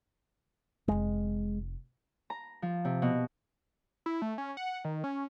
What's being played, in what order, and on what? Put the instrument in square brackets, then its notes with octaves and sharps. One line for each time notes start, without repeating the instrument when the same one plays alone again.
[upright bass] F1 C4 [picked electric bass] G#3
[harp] A#5
F3
C3
B2
[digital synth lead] E4
A3
C#4
F#5
D#3
C#4